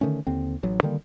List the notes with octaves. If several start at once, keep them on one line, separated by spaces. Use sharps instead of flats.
D3 D#3 A3 C#4
D#2 D3 C4
A1 F#3
D3 D#3 G3 A#3